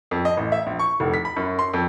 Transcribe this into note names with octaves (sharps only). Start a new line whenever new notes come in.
F2
D#5
A1
E5
A#1
C#6
F1
B6
B5
F#2
C6
F2